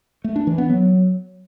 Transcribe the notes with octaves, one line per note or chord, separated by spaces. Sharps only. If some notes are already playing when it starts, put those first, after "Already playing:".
A3
D4
E3
B3
F#3